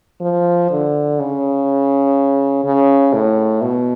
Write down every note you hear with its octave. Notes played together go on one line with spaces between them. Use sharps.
F3
D3
C#3
C#3
A2
B2